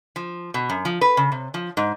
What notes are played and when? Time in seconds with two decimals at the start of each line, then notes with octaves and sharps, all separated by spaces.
0.16 F3
0.54 B2
0.70 F#2
0.85 F3
1.01 B4
1.17 C#3
1.32 C3
1.54 F3
1.77 G#2